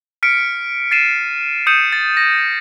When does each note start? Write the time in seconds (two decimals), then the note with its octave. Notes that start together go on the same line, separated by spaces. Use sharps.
0.23 F6 B6 C#7 D7
0.91 A6 C7 D#7 E7
1.67 D#6 G6 C#7 D#7 E7
1.93 A6
2.17 A#6